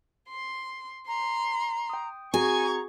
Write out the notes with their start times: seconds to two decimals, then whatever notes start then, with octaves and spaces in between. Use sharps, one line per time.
0.29 C6
1.08 A#5 C6
1.90 G5 D#6
2.34 C4 F#4 G#4 G#5 A#5 C#6 G#6